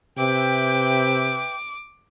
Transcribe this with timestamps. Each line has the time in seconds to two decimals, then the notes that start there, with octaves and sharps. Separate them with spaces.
0.18 C3 B4 E5 G5 D6